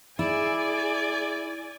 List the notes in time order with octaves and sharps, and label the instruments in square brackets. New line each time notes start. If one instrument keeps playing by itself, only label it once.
[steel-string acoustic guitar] E4 [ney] G#4 [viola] D5 G#5